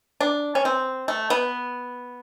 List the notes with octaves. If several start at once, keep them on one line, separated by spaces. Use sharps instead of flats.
D4
C#4
C4
A3
B3